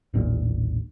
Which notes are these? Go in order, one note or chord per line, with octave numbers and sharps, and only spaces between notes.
D#1 A1 A#2